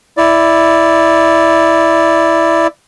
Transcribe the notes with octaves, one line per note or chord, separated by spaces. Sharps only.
E4 D5